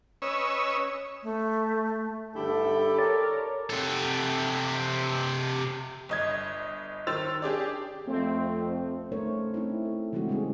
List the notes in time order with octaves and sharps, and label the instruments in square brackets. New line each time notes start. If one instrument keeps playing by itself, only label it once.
[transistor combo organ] C#4 B4 C#5 D#5 E6
[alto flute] A3
[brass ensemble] B1 G2 D3 [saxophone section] E4 G4 [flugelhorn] A4
[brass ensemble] A#4 C#5 [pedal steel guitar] D5
[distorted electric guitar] C3 A4
[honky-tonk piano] G1 D#5 G#6
D#3 C5 E6 A6 F7
D4 G4 G#4 D5
[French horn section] F2 A3 [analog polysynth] C4
[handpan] A3 C#4 D#4 A#4 C5 C#5
C4 D#4 E4
A4
C#3 E3 G#3 C4 E4 F#4
G3 B3 C#4 E4 G#4